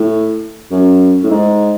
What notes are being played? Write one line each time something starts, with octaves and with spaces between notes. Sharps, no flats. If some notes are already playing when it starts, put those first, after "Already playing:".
Already playing: A2
F#2
A2
G#2